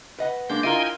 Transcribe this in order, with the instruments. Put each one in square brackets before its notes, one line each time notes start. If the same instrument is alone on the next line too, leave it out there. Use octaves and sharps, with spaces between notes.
[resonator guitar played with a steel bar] B4 D#5 F#5
[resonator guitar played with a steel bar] G#3 D4 [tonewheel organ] A#3 G6
[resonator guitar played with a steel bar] E4 F4 A#4 [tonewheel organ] D#5 G5 G#5